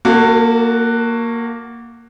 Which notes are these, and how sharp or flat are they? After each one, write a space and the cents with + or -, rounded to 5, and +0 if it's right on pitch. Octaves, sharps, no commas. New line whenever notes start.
A#3 +0 F#4 +0 A4 +40